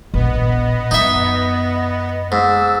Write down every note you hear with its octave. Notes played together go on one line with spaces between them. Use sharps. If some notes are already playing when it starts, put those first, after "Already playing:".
D#1 A#1 B3 D#5
F#2 D#4 E5
G#2 E6